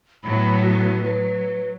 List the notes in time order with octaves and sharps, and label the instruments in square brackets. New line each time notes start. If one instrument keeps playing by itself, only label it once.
[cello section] A2 F#3 B3 [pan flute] B5
[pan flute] F#4
[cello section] F#3 [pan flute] B4